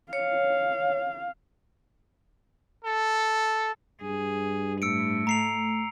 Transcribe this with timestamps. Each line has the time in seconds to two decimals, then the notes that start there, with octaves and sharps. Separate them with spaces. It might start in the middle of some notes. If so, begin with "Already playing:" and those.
0.13 C#5 F5
2.85 A4
4.02 G2 G#4
4.82 A2 E6 C#7 D7
5.27 A3 A#5 C7 F7